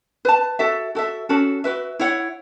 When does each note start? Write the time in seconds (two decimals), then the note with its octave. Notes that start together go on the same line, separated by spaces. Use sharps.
0.25 B4 A5
0.59 F#4 A4 E5
0.95 F#4 A4 E5
1.29 C#4 F#4 A4
1.64 F#4 B4 E5
1.99 E4 C#5 F#5